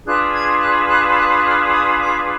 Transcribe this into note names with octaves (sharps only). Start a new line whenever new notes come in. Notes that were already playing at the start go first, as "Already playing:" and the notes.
D4 F4 G#4 B4 F#6
G#6
F#6
F#6
F#6
F#6
F6
D#6
D6